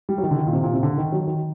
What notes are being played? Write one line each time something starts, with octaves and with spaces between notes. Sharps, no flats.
G3
F#3
D#3
D3
D#3
A#2
C3
A#2
C3
D3
D#3
F#3
D#3